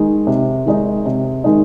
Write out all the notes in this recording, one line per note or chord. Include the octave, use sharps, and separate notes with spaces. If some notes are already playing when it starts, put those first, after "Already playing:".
Already playing: D#3 G#3 D#4
C3
D#3 G#3 D#4
C3
D#3 G#3 D#4